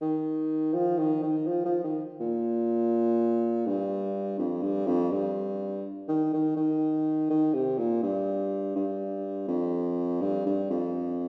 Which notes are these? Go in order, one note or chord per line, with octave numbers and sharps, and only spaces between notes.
D#3
F3
D#3
D#3
F3
F3
D#3
A#2
G2
F2
G2
F2
G2
D#3
D#3
D#3
D#3
C3
A#2
G2
G2
F2
G2
G2
F2